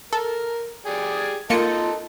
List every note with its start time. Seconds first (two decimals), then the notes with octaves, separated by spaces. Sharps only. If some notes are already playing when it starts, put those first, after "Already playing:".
0.13 A4 A#4
0.86 G4 G#4 D5
1.50 A#3 D#4 F4 A4 C#7